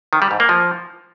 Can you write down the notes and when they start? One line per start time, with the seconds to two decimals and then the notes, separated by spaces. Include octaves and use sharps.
0.13 D#3
0.22 G3
0.31 G#2
0.40 A#3
0.49 F3